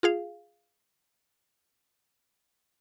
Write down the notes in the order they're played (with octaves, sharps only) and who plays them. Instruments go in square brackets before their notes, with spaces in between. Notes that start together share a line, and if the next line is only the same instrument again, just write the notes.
[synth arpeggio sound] F4 G#4 F5